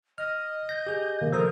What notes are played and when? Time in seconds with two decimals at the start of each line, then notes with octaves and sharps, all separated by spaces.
0.18 D#5 F6
0.69 G6 A#6
0.87 G4 G#4
1.21 C3 D#3 A#3
1.32 F3 A4 A#4 C5 A#5 D#6